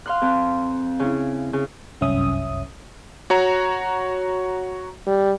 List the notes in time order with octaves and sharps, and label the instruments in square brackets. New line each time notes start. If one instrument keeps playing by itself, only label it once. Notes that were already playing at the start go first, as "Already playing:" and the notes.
[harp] F5 C6 F#6
F2
C#3 C#4 E4
C#3
[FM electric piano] G1 C2 F#2 C#4 E5 D#6
[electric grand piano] F#4 C#5 A#5
[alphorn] G3